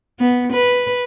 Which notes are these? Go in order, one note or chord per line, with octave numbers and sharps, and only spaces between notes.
B3
B4